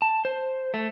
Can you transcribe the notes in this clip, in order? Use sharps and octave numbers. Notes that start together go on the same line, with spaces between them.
A5
C5
A3